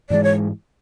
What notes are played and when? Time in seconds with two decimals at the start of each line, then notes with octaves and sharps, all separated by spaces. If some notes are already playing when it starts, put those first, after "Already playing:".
0.10 G#2 E3 G#3 D5
0.23 C#5